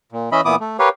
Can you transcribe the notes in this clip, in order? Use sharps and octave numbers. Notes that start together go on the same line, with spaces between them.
A#2
E3 C#4 D#5 E5 B5
A#2 E3 B3 E4 D6 D#6
A3
G4 A#4 B4 C#5 F5